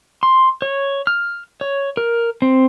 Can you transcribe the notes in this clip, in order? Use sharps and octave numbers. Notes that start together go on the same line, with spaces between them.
C6
C#5
F6
C#5
A#4
C4